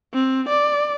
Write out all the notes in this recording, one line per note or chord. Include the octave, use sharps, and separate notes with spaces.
C4
D5